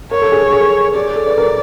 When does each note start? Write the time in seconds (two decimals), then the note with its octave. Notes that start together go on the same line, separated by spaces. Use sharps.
0.11 A#4 C#5
0.22 A4
0.32 G#4
0.42 A4
0.52 G#4
0.95 G#4 D5
1.16 A4
1.27 B4
1.38 A#4